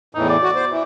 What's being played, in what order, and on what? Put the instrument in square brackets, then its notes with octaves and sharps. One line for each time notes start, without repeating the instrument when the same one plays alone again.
[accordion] E2 A2 E3 [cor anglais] D#4
[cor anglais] D5
[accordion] F#4
C5
E3